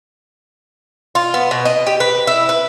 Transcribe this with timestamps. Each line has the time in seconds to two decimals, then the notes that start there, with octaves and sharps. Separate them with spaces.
1.15 F4
1.34 B3
1.51 B2
1.65 D#5
1.87 G4
2.00 B4
2.27 E4
2.49 B4